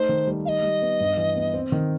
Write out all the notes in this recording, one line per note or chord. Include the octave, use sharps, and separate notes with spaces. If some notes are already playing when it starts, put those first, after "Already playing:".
Already playing: A3 D#4 C5
D#3
G3
D#4 D#5 F5
G3
B3
G2
E3
B3
C4
D#3